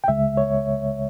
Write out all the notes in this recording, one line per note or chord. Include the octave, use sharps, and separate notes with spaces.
G5
C#2 C#3 G#3 E5
C#5